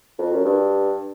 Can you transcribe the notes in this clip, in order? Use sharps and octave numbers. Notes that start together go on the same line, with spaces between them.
F2
F#2
G2